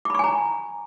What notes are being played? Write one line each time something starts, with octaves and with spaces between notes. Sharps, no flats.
G#5 A#5 B5 C#6 D6